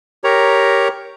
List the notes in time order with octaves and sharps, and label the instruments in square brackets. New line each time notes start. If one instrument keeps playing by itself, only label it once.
[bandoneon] G4 A#4 C#5 A#5